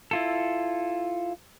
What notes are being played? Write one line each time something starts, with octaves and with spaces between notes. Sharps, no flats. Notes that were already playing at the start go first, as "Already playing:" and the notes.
E4 F4 A4